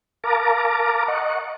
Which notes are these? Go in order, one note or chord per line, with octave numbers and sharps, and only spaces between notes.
A#4 F5 A5 A#5 D6
D#5 F#5 C#6